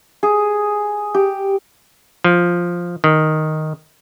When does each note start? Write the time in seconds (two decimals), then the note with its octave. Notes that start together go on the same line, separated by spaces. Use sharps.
0.23 G#4
1.14 G4
2.24 F3
3.04 D#3